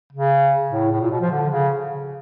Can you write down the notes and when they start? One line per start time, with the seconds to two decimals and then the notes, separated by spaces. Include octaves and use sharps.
0.13 C#3
0.71 A2
0.91 A2
1.01 A#2
1.11 B2
1.21 F3
1.31 D3
1.50 C#3